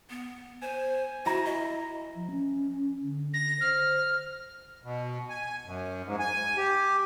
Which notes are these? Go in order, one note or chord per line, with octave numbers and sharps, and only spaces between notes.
B3
C5 G#5
E4 F#4 A#5
D#5
F3
C#4
D3
A#6
C5 F6
B2
G#5
F#2
G#2
G#5
G4